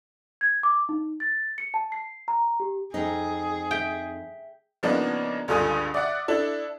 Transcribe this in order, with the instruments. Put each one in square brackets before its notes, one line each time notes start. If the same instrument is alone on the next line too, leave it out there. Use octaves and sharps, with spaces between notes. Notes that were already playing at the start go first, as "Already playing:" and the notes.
[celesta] G#6
D6
D#4
A6
C#7
A5
C7
A#5
G4
[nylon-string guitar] F2 D#4 [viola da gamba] G#4 [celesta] C5 G5
[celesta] E5 B6 [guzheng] G5
[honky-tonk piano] C#3 F3 A#3 B3 D4 D#4
C#2 G2 D3 F4 G#5 D#6
D5 E5 F#5 D6
D4 E4 A4